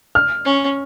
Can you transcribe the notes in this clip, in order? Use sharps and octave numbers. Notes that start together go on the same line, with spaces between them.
F6
C#4